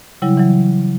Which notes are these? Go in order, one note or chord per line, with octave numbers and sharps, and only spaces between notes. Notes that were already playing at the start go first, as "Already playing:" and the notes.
C#3 F#3 G3 E4
E3 F#3